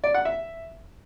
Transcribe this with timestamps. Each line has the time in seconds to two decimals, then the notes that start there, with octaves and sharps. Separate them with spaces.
0.04 D5
0.14 F#5
0.25 E5